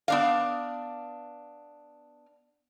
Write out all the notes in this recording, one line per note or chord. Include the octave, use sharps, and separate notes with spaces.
B3 D4 F5